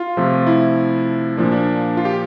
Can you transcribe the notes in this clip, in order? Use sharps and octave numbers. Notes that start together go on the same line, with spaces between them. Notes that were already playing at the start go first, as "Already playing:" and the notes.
Already playing: F4
C3 F3 A3
E4
A#2 F3 A#3 D4
D4
F4
G4